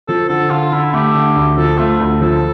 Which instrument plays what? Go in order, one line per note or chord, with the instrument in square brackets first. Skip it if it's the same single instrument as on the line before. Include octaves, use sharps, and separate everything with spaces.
[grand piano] F3 [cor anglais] A4
[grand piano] D3 [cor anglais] A4
[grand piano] D3 [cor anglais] F4
[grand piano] D3 [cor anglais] E4
[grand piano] A3 [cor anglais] G4
[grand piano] D3
D2
[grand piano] F3 [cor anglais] A4
[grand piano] A3 [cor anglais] F4
[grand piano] D2
[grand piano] F3 [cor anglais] A4